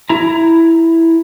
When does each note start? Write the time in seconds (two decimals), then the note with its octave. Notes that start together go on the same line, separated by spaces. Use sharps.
0.09 E4 A#5